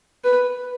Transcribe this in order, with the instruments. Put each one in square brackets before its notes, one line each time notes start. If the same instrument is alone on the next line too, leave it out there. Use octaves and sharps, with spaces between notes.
[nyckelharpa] B4